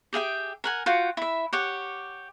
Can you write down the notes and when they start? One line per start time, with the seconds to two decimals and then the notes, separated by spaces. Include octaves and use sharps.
0.13 G4 G#4 E5 G5
0.64 A#4 F#5 G#5
0.86 F4 F#4 F#5 G5
1.17 E4 E5
1.53 G4 C#5 F#5